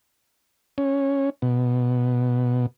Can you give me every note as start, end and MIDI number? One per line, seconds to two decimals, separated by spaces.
0.78 1.30 61
1.42 2.66 47